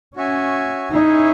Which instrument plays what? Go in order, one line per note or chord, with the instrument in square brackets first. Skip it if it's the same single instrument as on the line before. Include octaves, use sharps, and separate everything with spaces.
[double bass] C#4 [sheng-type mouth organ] F#4 C#5 E5 G#5
[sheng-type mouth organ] C#4 E4 G#4 C#5 E5 [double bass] D#4